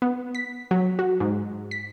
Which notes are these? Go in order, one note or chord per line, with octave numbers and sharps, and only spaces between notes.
B3
B6
F#3
F#4
G#2
B6